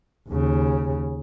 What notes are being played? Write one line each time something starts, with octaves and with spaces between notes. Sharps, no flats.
D#2 C#3